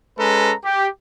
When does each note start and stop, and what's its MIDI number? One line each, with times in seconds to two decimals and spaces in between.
0.18 0.53 56
0.18 0.53 61
0.18 0.53 69
0.18 0.53 71
0.18 0.53 82
0.63 0.87 67